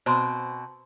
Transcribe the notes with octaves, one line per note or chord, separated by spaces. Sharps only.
B2 C4 C5 A#5 C6